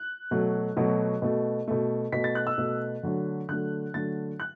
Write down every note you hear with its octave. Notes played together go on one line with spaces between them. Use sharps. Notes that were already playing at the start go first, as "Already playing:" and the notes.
Already playing: F#6
B2 F#3 A3
B2 F#3 A3
B2 A3
B2 A3
B2 A3 B6
A6
F#6
E6
B2 A3
D3 F#3 A3
D3 F#3 A3 F#6
D3 F#3 A3 A6
F#6